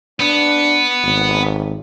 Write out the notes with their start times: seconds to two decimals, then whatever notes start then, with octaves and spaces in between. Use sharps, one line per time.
0.20 B3 D4
1.05 G#1